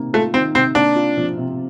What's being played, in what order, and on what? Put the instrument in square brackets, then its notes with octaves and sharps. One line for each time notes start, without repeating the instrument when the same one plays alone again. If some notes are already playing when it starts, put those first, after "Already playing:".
Already playing: [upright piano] C3 D#3 A#3
[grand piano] A3 [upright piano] F4
[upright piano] D#3 [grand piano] C4
[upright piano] C3 [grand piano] C4
[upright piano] A#3 [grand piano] D4
[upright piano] F4
F3
C3